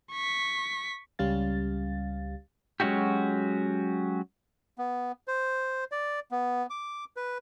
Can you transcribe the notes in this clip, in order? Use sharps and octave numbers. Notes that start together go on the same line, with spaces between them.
C#6 B6
C#2 G3 C#4 G4 F5 A6
F#3 G#3 C#4 D#4 F#4 G4
B3
C5
D5
B3
D6
B4